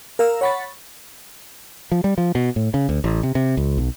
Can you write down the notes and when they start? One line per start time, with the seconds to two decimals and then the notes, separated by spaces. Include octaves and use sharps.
0.19 A#4 F5 A#5 E6
0.41 C#5 F#5 B5 C#6 A6
1.92 F3
2.04 G3
2.18 F3
2.35 B2
2.56 A2
2.74 C#3
2.89 D2
3.04 A1
3.23 C3
3.35 C3
3.57 C#2
3.78 B1